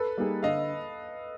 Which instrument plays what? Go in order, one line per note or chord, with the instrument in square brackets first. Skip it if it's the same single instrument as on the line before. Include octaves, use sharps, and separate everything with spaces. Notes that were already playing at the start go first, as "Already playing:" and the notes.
Already playing: [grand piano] A4 B4
[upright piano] G3 A#3 D#4 G#4
[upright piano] D3 [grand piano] D#5 F5